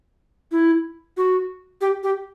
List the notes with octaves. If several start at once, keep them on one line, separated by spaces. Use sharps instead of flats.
E4
F#4
G4
G4